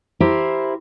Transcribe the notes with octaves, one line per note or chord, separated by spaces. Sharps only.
E4 G4 A#4 C5